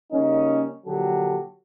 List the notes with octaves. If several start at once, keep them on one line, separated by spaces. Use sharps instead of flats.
C#3 G3 A#3 C#4 D#4
A#1 D3 F#3 G4 A4